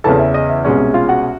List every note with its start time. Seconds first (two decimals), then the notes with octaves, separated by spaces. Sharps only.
0.04 E2 C#3 E3 A4 A5
0.19 E5
0.34 D#5
0.49 E5
0.64 C2 B2 G#3 C#4
0.94 F4 F5
1.09 F#4 F#5